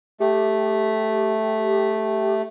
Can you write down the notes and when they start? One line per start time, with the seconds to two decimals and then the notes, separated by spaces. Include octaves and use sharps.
0.20 A3 G4